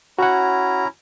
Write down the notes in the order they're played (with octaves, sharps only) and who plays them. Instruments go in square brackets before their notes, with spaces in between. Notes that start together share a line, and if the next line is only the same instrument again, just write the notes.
[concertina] C#4 E4 A#5 [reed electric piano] F#4 F#5